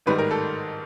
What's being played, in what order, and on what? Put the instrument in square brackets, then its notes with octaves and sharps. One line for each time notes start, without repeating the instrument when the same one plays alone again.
[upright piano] A1 G#2 D#3 G3 B4
A#4
A4